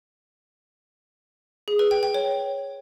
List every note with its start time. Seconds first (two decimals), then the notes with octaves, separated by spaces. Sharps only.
1.68 G#4
1.79 B4
1.91 G5
2.03 G5
2.14 C#5